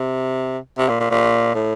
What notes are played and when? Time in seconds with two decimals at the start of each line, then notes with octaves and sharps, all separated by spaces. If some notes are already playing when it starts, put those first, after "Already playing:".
Already playing: C3
0.78 C3
0.89 A#2
1.00 A#2
1.11 A#2
1.55 A2